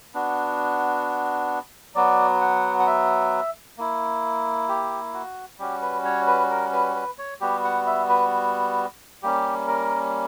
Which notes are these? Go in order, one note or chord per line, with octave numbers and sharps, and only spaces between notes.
B3 D4 F#4
F#3 B3 F#4 D5
F#5
F#5
E5
A#3 E4
G4
F#4
G3 C#4 F#4 G4
B4
C#5
B4
A#4
B4
B4
C#5
G3 B3 F#4 G4
F#5
E5
B4
G3 A#3 C#4 G4
A#4